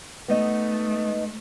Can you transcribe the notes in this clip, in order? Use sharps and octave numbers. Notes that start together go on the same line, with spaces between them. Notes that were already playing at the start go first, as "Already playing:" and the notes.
A3 B3 D#4 D#5